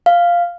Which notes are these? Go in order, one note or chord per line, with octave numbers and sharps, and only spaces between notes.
F5